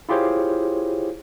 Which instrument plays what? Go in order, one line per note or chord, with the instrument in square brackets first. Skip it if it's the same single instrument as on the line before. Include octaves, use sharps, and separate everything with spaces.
[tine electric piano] E4 F4 G4 G#4 C5 C#5